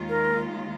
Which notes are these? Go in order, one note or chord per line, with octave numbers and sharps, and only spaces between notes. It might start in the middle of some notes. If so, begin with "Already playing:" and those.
Already playing: D#2 D#3 G#3 F4
A#4